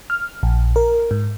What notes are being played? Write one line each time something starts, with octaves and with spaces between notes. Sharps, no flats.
F6
A#1
A#4
G#2